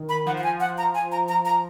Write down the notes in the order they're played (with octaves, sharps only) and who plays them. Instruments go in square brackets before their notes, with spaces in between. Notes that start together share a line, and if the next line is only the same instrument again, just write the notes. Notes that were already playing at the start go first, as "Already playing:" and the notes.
Already playing: [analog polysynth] D#3
[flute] B5
[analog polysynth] F3 [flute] F#5
[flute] F#5
G#5
F#5
A#5
G#5
A#5
A#5
A#5